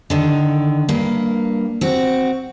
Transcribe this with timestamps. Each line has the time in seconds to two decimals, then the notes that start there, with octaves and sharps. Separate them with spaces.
0.10 D3 D#3
0.89 G2 A#3
1.81 C4 F#4